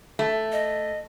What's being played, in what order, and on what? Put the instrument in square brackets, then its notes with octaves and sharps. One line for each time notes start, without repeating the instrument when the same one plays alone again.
[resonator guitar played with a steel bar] A3
[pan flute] D#5